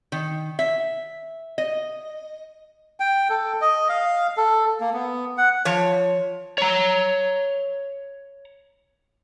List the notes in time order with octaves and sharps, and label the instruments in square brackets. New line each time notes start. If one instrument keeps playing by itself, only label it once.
[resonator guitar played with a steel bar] D#3
E5
D#5
[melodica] G5
A4
D#5
F5
A4
A#3
B3
F#5
[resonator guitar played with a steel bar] F3 C#5
[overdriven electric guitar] C#5 A#5